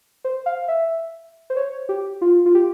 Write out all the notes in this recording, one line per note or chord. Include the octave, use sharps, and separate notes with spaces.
C5
F5
E5
C5
C#5
G4
F4
F4
G4